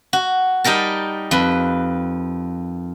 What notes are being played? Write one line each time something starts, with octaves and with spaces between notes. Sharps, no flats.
F#4
G3 D#4 G4 A#4 A5
F2 B4